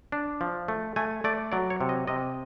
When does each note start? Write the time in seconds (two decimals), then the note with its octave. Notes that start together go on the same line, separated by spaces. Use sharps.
0.12 D4
0.41 F3
0.68 A3
0.96 A3 G#5
1.24 A3 D5
1.52 F#3 D5
1.70 C#5
1.81 C3
1.89 D#5
2.07 C3 D#5